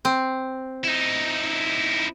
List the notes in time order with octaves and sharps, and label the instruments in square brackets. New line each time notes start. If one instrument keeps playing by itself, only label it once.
[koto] C4
[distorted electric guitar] D#4 E4